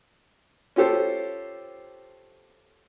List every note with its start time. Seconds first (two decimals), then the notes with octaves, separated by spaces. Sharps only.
0.76 C#4 F4 G4 A4 C5